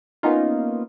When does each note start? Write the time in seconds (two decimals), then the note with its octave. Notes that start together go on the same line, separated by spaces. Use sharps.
0.23 A#3 B3 C#4 D#4 F4